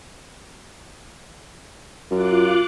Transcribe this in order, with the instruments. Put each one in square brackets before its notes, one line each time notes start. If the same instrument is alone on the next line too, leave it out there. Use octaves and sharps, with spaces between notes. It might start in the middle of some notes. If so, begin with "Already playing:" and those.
[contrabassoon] F#2 [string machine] F4 D6 F#6